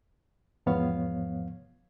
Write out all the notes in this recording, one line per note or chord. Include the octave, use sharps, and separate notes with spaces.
E2 G#2 F3 B3 C#5 F5